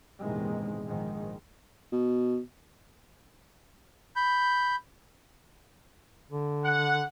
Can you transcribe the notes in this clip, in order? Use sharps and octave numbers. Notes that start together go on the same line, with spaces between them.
A#1 E2 G#2 C3 D#3 G#3
A#1 G#2 D#3 G#3
B2
B5 G6
D3
F#5